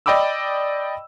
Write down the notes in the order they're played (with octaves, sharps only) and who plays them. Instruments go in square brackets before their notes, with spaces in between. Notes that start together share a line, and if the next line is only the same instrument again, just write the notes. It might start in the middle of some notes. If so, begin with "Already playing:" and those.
[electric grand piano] D5 D#5 G5 B5 D6 E6